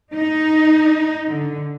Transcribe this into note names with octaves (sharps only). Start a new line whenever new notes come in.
D#4
D3